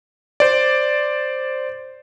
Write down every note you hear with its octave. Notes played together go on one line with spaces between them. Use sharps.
C5 D5